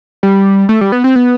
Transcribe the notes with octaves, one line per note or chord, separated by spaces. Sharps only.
G3
A3
G3
B3
C4
B3